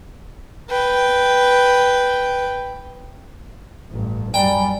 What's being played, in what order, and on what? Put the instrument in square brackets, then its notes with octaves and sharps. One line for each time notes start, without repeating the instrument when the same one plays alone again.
[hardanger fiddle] B4 G5
[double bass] A1 G2
[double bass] F#2 G3 [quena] D5 [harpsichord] G5 [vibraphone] G#5 A#5 B5